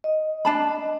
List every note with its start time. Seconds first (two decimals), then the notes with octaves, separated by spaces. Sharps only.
0.04 D#5
0.45 D4 A5 B5